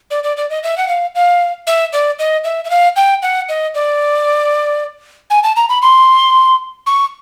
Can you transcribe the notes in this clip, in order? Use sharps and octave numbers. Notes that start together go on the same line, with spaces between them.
D5
D5
D5
D#5
E5
F#5
F5
F5
E5
D5
D#5
E5
E5
F5
G5
F#5
D#5
D5
G#5
A5
A#5
B5
C6
C#6